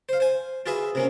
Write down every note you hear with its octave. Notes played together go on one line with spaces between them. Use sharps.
C5 F5
C5 G#5
F4 F#4 G#4 B4 E5
C3 A#3 C#4